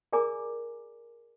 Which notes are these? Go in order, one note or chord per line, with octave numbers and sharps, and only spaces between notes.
G#4 A#4 D5 G#5 A#5 D6